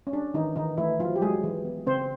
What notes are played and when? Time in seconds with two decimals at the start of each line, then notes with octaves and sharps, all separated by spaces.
0.07 C#4
0.12 G3 D4
0.34 D#3 E3 D#4
0.56 D#3 E3 D#4
0.77 E3 A3 E4
1.00 F3 F#3 F4
1.16 G4
1.21 F#3 G#3 G#4
1.44 E3
1.65 B3
1.87 C#3 C4 C5